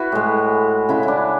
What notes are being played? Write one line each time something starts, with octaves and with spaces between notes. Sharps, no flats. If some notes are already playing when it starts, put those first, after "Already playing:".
Already playing: E4 F#4 B4
A2 G#3
C#3 G#3 E4
E4
D4